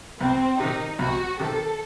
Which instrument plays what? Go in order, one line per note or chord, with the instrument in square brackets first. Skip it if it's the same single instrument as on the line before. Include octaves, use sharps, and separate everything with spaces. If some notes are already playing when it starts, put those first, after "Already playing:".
[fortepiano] C2 [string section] C4
[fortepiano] C3 D#3 [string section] D#4
[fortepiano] C2 [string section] F#4
[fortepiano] C3 D#3 [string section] A4